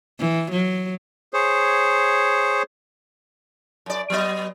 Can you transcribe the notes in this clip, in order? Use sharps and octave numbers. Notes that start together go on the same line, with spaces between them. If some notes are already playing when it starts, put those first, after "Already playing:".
E3
F#3
G#4 C5 C#5
F#2 D5
F#3 B3 D#5